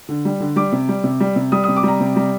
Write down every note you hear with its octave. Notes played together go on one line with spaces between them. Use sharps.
D3
G3
D3
G3 D6
C3
G3
C3
G3
C3
G3 D#6
D#6
C3
D6
G3 A#5
C3
G3